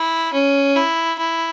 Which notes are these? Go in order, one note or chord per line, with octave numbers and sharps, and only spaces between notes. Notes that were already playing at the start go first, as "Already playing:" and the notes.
Already playing: E4
C#4
E4
E4